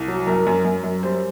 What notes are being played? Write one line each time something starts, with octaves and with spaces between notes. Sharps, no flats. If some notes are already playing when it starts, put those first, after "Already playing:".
Already playing: C2
F#3
F#2 A#4
F#2
F#2
F#2
G3 C5